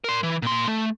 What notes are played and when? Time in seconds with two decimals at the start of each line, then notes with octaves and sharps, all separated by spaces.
0.04 A#4 C6
0.23 E3
0.42 A#2 C6
0.67 A3